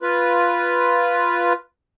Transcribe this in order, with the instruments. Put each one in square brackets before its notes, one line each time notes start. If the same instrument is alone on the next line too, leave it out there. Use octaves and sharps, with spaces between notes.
[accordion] F4 B4